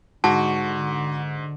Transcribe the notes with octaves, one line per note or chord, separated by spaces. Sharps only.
G#2 D3 F#4 A5